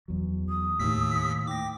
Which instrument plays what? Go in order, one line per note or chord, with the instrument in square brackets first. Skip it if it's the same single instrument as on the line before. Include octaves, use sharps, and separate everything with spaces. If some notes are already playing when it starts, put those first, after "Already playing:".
[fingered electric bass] E2 F#3
[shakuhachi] D#6
[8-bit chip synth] D#2 E6 B6 [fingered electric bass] A2 D#3
[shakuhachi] G5 [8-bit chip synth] D6 A#6